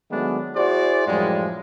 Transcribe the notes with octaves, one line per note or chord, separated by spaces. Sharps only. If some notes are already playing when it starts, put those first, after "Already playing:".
D#3 F#3 G#3 A3 B3 D4
E4 F#4 G#4 C5 D5
F#2 A2 F3 G3 G#3